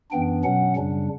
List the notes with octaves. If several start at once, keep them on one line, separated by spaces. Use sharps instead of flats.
F#2 E3 B3 D4 G5
B2 F#3 C#4 F#5
F#2 C#3 G3 D4